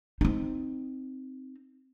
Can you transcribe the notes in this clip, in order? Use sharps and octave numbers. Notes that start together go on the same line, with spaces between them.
C4 D#4